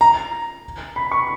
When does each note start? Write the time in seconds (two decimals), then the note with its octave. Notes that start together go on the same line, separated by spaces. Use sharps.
0.01 A#5
0.96 B5
1.12 C#6